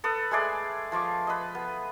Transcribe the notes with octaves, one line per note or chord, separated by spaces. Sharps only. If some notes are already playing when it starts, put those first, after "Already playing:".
A4 B4 D#6
G#3 A3 G#4 D5
F3 F4 C#6 D6
B4 D#5
B3